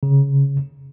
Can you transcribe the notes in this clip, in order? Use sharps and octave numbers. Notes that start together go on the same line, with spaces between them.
C#3